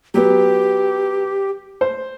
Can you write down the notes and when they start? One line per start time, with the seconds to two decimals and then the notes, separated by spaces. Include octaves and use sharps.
0.14 F#3 B3 G4
1.81 C5